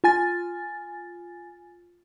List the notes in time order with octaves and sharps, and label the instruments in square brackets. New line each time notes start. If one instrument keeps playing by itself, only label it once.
[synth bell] F4 G#5 A6